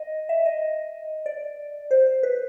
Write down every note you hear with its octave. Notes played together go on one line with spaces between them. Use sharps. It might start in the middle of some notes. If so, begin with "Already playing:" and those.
Already playing: D#5
E5
D#5
D5
C5
B4